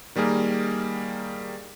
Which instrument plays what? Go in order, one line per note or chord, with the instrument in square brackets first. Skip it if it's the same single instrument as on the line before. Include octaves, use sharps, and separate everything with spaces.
[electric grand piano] D#3 G3 A#3 G#4 A#4